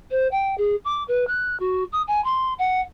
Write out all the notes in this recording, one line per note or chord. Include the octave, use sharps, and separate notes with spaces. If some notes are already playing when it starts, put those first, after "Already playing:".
C5
G5
G#4
D6
B4
F#6
F#4
D#6
G#5
C6
F#5